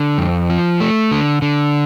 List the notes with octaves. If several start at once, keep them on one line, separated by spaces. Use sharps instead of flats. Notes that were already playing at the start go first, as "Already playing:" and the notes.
Already playing: D3
F2
F3
A3
D3
D3